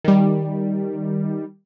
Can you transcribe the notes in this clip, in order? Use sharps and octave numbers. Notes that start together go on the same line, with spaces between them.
D#3 G3